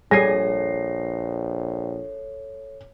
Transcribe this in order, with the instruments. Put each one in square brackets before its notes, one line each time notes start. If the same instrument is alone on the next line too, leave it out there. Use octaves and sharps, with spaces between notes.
[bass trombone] A#1 [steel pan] G3 G#4 G#5 [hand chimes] A4 C#5 [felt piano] A#6 C7